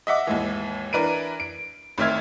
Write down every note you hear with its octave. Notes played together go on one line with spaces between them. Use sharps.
D#5 E5 F#5 D6
D#2 G#2 E3
E3 D4 A#4 B4 D7 D#7
D7
A1 D#3 C4 E5 F6 G#6